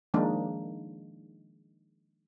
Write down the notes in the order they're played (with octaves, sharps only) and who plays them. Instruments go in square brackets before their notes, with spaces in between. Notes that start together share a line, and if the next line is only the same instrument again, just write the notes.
[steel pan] D#3 F3 G#3 A#3 D4 D#4